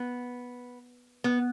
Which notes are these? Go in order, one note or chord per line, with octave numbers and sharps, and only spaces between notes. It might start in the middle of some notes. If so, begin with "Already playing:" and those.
Already playing: B3
B3